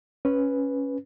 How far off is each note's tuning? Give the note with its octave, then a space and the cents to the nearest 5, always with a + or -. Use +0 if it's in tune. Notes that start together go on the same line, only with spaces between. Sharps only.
C#4 +0 B4 +0